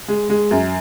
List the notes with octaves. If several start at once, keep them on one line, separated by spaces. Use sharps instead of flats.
G#3
G#3
F#2